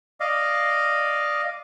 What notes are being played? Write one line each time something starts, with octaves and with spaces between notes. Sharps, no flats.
D5 D#5 F5